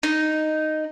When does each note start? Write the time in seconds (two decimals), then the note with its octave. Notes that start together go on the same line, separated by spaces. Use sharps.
0.03 D#4